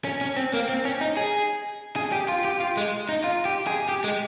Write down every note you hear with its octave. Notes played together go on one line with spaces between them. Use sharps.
C#4
C#4
C4
A#3
C4
C#4
D#4
G#4
G#4
G4
F4
G4
F4
G#3
D#4
F4
G4
G#4
G4
G#3